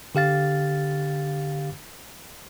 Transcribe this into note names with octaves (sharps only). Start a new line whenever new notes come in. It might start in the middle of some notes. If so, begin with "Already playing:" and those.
D3 G4 F5 A6